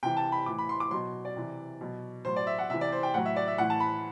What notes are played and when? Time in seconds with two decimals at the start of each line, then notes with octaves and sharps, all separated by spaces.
0.03 C3 E3 G5
0.17 A5
0.32 B5
0.46 A2 E3 D6
0.58 B5
0.69 C6
0.80 D6
0.91 B2 F#3 C6
1.25 D5
1.36 C3 E3
1.81 B2 F#3
2.25 A2 F#3 C5
2.36 D5
2.47 E5
2.59 F#5
2.70 C3 E3 E5
2.81 D5
2.92 C5
3.03 G5
3.14 A2 F#3 F#5
3.25 E5
3.36 D5
3.48 E5
3.58 A2 E3 F#5
3.70 A5
3.80 B5